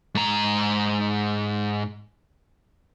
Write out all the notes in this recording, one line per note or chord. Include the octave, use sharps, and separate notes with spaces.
G#2 A#5